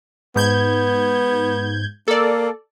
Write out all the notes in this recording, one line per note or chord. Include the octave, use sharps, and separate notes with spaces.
G#2 B3 G6 G#6
A#3 A4 D5